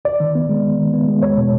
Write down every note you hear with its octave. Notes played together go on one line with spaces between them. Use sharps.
D#2 D5
D#3
B3
G#3
D#2
D#3
B3
G#3
E2 C#5
B2